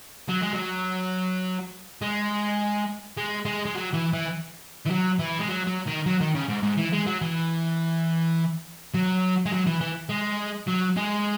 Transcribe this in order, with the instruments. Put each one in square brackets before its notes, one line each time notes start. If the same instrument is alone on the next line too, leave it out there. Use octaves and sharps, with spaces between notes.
[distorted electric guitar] F#3
G#3
F#3
G#3
G#3
G#3
G#3
F#3
E3
E3
E3
F#3
E3
G#3
F#3
F#3
D#3
F#3
D#3
C#3
G#2
G#2
E3
G#3
F#3
E3
F#3
G#3
F#3
E3
E3
G#3
F#3
G#3